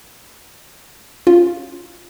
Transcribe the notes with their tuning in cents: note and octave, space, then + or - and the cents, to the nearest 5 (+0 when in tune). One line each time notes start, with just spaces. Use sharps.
C#4 +0 F4 +0